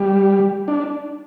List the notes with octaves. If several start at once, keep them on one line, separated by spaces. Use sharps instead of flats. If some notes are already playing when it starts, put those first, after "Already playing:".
Already playing: G3
D4